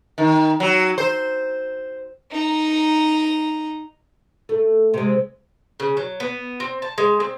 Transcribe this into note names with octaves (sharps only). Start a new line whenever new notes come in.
D#3
F#3
C5
D#4 A#5
A3
C3 G#3
C#3
F#3
B3
C4
A5
G#3
C4